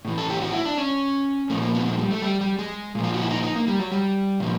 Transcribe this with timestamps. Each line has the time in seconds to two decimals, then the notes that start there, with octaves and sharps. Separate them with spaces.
0.05 A2 E3
0.18 A4
0.30 G4
0.41 F#4
0.53 E4
0.65 D4
0.78 C#4
1.50 A#2 F3 A3
1.62 A#3
1.75 B3
1.86 G#3
1.99 G3
2.11 A3
2.22 G3
2.41 G3
2.59 G#3
2.95 A#2 F3
3.04 F4
3.14 F#4
3.22 E4
3.31 D#4
3.43 D#4
3.55 A#3
3.68 G3
3.79 F#3
3.92 G3
4.40 A#2 F3